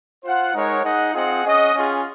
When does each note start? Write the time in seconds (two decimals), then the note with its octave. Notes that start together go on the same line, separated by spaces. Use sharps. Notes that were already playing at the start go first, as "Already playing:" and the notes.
0.23 F4 C5 F#5
0.54 G#3 D#4 A#4 C#5 F#5
0.84 D#4 G#4 D#5 F#5
1.14 C4 F4 G#4 D#5 F#5
1.43 C#4 G#4 D#5 F#5
1.74 C#4 F4 G#4